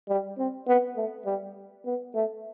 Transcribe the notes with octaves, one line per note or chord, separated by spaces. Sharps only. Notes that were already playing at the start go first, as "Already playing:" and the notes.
G3
C4
B3
A3
G3
B3
A3